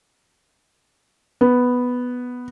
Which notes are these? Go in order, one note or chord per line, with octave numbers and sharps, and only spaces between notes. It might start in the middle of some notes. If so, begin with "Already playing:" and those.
B3